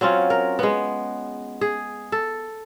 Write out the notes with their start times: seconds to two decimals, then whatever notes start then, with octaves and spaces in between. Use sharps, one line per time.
0.01 F#3 C4 C#4 F4
0.30 A#4
0.59 G#3 B3
1.61 G#4
2.12 A4